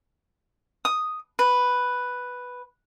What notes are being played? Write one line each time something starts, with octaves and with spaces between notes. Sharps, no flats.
D#6
B4